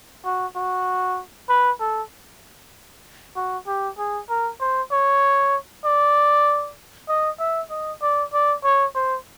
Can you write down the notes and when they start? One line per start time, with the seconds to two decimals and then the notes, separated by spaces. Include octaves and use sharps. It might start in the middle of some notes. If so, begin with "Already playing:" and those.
0.25 F#4
0.56 F#4
1.49 B4
1.81 A4
3.36 F#4
3.67 G4
3.98 G#4
4.29 A#4
4.60 C5
4.91 C#5
5.85 D5
7.09 D#5
7.40 E5
7.71 D#5
8.02 D5
8.33 D5
8.64 C#5
8.95 C5